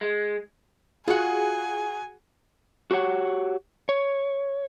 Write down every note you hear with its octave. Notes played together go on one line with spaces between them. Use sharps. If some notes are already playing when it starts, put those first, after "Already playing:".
G#3
F4 F#4 G#4 F#5 G#5
F#4 G4 C#5 F#5
C#5